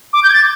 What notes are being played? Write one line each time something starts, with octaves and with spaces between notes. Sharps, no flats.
D6
G6
G#6
A6